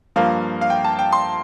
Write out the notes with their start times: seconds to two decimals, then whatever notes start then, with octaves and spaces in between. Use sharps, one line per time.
0.16 G2 F3 A#3 F5
0.61 F5
0.70 G5
0.85 A5
0.99 G5
1.13 C6